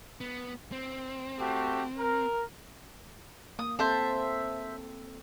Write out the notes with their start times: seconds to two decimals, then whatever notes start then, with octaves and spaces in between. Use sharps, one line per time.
0.21 B3
0.72 C4
1.39 A3 F#4 G4
1.97 A#4
3.59 A#3 D#6
3.79 C4 A4 C5 E5 A5